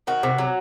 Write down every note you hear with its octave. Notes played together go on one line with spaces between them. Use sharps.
D#3 F#4
C3
F#3